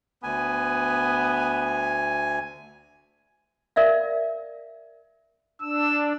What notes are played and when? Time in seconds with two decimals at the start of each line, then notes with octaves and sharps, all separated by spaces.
0.23 D2 B3 G#5
3.76 A#4 D5 E5 F5
5.62 D4 E6